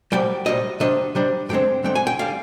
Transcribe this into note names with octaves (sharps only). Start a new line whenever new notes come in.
C2 A#2 G3 G5
C2 A#2 G3 D#5
C3 G3 D4 D#5
C3 G3 D4
G2 D3 G#3 C4 G5
G2 D3 G#3 C4 G5
G#5
G5
D3 G3 D4 F5